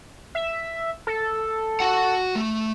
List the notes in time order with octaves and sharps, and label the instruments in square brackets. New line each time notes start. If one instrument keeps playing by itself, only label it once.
[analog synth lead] E5
A4
[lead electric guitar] F#4 F#5
A3